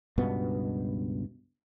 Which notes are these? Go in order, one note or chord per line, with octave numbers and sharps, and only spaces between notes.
C#2 G2 B2 B3